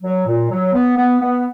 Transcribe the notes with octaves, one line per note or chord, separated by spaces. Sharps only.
F#3
A#2
F#3
B3
B3
B3